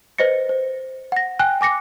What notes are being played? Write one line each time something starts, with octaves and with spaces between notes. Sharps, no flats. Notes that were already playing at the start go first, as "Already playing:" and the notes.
B4 C5 D#5 A#6 C#7
C5
F#5 A#6
G5 G#5 F#6
G#5 D6 A#6 C#7